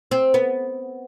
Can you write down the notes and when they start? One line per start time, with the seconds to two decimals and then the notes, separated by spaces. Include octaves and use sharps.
0.11 C4
0.34 B3